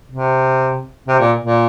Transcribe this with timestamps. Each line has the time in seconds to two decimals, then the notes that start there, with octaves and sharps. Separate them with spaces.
0.11 C3
1.07 C3
1.19 A#2
1.44 A#2